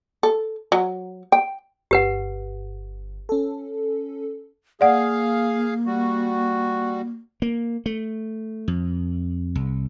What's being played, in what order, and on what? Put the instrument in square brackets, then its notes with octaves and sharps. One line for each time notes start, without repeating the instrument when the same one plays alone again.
[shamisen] A4
F#3
G5
[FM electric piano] G1 [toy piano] G4 B4 F#5
[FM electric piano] C#4 A4
[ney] A#3 [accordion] G#4 F5 [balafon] D5 F#5
[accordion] G3 F#4
[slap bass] A#3
A3
F2
C2